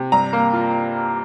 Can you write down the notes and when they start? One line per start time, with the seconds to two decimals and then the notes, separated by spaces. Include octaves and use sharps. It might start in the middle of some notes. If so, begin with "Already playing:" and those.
Already playing: C3
0.12 G2 A#5
0.33 A#3
0.53 F4